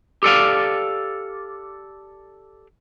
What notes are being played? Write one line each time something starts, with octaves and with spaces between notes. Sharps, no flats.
G4 A4 D5 F5